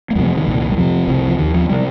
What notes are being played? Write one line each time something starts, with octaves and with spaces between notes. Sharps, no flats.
A#3
F2 C3 G3
F3
D#3
C2 A#2
G3
F2 C3 F3
C2 C3
F3
D#2 D#3
F3
C3 G3